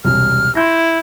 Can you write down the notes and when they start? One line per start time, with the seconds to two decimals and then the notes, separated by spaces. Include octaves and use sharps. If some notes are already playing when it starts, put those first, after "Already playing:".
0.04 E1 C2 F6
0.55 E4 C6 G6 A#6